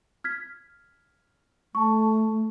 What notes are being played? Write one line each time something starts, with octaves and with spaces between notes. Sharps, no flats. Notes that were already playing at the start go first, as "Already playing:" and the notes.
F6 G#6 B6
A3 A5 C#6